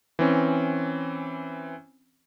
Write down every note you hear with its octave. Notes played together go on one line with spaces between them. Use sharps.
E3 C4 C#4